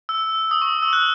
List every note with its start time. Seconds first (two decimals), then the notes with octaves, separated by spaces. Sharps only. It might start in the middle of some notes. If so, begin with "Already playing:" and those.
0.09 E6
0.51 D#6
0.62 C#6
0.82 E6
0.93 F#6